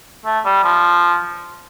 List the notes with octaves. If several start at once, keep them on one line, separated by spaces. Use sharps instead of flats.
A3
G3
F3